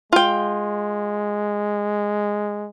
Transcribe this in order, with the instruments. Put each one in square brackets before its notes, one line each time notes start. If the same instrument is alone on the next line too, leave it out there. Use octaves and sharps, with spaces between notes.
[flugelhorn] G#3 [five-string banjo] F4 G5